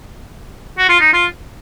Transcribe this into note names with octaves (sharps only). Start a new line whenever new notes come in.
F#4
F4
D#4
F4